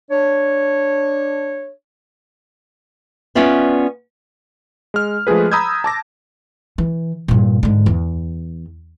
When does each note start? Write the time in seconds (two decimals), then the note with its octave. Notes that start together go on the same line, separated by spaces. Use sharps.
0.11 D4 C#5
3.35 B3 C#4 F4 D5 E5
4.94 G#3 F6
5.27 F3 G#3 A3 G#4 B4
5.52 A#5 B5 D#6 E6 G6 G#6
5.84 A5 D6 A#6
6.78 E3
7.28 G2 A#2
7.63 G#2 D3
7.86 E2